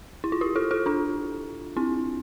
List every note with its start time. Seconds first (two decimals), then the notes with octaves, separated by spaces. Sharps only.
0.24 E4
0.32 F4
0.41 E4 G4
0.56 F4 A4
0.71 F4 A4
0.86 D4 F4
1.77 C4 E4